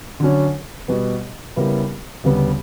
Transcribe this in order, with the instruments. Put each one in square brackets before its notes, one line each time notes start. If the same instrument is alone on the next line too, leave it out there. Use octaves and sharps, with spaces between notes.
[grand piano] D3 F#3 C#4
B2 G3 B3
C#3 G3 B3 E4 A#4
D2 C#3 G3 B3